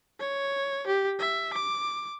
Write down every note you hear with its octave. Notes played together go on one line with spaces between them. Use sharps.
C#5
G4
E5
D6